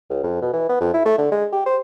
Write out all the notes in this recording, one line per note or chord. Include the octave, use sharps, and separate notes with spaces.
C#2
F2
B2
E3
B3
F2
E4
A3
D3
G#3
G4
C5